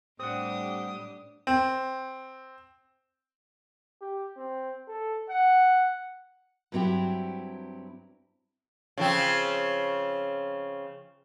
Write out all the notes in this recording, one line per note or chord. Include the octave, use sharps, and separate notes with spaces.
A2 G3 C4 D4 G4 F#5 D#6
C4
G4
C4
A4
F#5
G2 F#3 B3 C4 E4 G4
C#3 F3 C4